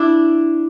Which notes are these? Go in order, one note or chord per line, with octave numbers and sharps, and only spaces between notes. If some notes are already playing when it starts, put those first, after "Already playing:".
Already playing: D4 E4